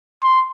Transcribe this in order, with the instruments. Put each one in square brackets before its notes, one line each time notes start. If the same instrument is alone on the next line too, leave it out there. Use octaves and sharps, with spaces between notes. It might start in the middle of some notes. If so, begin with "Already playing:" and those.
[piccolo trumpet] C6